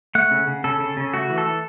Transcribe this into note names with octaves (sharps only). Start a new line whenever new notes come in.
A3 F#5
C#3
C#3
C#3 A4
C#3
C#3
A3 F#4
E3
A4
E3